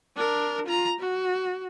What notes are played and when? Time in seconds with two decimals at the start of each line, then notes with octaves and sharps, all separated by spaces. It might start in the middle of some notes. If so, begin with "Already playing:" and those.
0.16 D4 A#4
0.66 F4 A#5
1.00 F#4